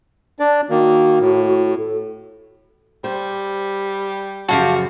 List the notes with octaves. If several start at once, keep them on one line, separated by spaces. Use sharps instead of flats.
D4 D5
D#3 A#3 F#4
A2
A4
G3 C5
F#2 C#3 F3 F#4 G4 F5 A5